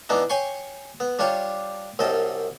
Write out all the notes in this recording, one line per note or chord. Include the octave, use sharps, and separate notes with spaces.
E3 B3 D4 D#4
C#5 G5 G#5 C6 C#6
B3
G3 D4 F4 C#5 G5
C2 F#2 D#5 G5 A5